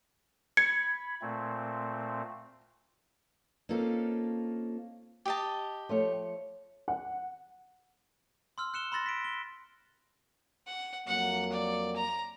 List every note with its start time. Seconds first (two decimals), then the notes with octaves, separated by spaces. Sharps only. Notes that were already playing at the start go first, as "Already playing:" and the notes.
0.57 B5 G#6 C#7
1.21 A#2 A3 C4
3.69 A#3 C4 C#4 D#4 F4 A4
5.25 G4 D#5 A5
5.89 F3 A3 C#5
6.88 F#5
8.58 C6 E6 F6
8.74 F#6 C#7 E7 G7
8.92 B5 C6 E6 A6 A#6
9.06 B6 D7
9.24 G7
10.67 F#5
11.07 F2 F#3 A#3 F#5
11.52 D5
11.96 A#5